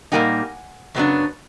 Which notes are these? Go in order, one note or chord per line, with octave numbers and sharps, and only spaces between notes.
A#2 G3 A#3 D#4 F#5 G#5
F#2 C#3 F#3 B3 D4